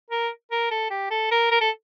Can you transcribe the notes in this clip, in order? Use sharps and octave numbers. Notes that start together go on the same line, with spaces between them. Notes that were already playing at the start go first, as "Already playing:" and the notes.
A#4
A#4
A4
G4
A4
A#4
A#4
A4